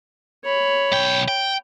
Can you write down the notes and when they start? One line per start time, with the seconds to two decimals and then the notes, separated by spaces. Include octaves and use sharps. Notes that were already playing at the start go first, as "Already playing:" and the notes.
0.45 C#5 B5
0.92 B1 G5
1.28 G5